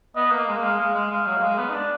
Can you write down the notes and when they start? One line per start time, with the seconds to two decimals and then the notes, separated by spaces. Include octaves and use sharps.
0.16 B3 D#5
0.31 A#3
0.48 G#3
0.57 A#3
0.63 G#3 F5
0.80 G#3
0.94 G#3
1.11 G#3 F5
1.26 F#3
1.37 A#3
1.43 G#3
1.59 B3
1.69 D#4
1.74 D4